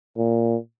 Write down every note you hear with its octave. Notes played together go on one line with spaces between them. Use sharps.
A#2